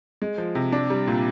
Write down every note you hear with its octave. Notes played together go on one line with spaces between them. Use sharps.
G#3
F3
C3
D4
G3
A#2